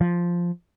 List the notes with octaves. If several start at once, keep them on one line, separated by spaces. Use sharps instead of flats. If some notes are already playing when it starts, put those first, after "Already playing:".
F3